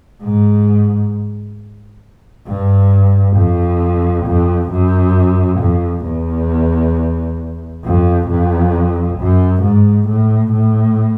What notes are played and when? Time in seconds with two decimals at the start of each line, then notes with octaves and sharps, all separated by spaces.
0.23 G#2
2.47 G2
3.37 F2
4.26 F2
4.71 F#2
5.60 F2
6.05 E2
7.84 F2
8.29 F2
9.19 F#2
9.63 G#2
10.08 A2
10.52 A2